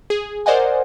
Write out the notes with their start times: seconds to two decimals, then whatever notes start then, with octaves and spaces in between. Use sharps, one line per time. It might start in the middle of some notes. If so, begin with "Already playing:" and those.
0.10 G#4
0.46 A#4 C5 D5 D#5 F#5 G#5